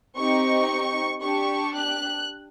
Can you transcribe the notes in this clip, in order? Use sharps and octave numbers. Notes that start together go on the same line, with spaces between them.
C4 D#4 G4 C#6
D4 G4 C#6
F#6